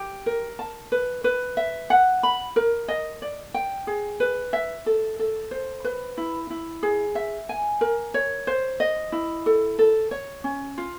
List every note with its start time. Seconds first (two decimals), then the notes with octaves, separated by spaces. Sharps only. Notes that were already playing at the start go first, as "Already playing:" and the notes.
Already playing: G4
0.26 A#4
0.59 A5
0.92 B4
1.24 B4
1.57 E5
1.90 F#5
2.23 B5
2.56 A#4
2.88 D#5
3.22 D5
3.54 G5
3.87 G#4
4.20 B4
4.53 E5
4.86 A4
5.19 A4
5.51 C5
5.84 B4
6.18 E4
6.50 E4
6.83 G#4
7.15 E5
7.49 G#5
7.81 A#4
8.14 C#5
8.47 C5
8.80 D#5
9.12 E4
9.46 A4
9.79 A4
10.11 C#5
10.44 C#4
10.78 F4